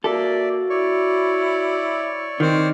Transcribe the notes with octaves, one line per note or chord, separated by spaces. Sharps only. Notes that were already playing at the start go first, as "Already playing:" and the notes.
A#3 F#4 A4 D5 E5
E4 C#5 D5 C#6
D#3 C4